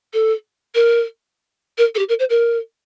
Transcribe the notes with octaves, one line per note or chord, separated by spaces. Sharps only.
A4
A#4
A#4
A4
G4
A#4
C5
A#4